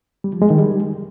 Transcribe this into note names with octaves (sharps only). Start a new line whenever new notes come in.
G3
F3
G#3
D#3
G3